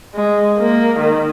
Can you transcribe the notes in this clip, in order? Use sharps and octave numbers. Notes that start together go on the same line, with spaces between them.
G#3
A#3
D#3